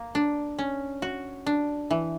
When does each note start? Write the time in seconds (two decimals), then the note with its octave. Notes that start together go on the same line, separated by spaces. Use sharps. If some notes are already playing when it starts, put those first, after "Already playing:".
Already playing: A#3
0.15 D4
0.59 C#4
1.02 F#4
1.46 D4
1.91 E3